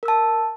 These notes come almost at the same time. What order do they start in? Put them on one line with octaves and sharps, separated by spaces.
A#4 E6 A5